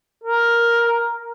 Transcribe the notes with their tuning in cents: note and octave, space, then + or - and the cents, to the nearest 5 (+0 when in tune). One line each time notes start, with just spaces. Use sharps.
A#4 +5